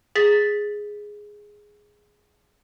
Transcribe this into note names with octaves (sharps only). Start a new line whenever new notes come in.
G#4 A6 B6